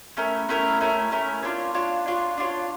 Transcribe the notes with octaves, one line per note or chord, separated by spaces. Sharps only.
A3 C#4 E4 A#4
A3 C#4 E4 A#4
A3 C#4 E4 A#4
A3 C#4 E4 A#4
D4 F4 C#5
D4 F4 C#5
D4 F4 C#5
D4 F4 C#5